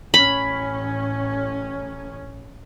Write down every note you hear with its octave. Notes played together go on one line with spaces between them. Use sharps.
A1 A2 C#4 B5